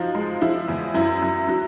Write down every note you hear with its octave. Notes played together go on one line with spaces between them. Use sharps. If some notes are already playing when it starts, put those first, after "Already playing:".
Already playing: F3 F#3 D#4 F4
G#3
F3 E4
E2
F#2 E4
F#2
F#3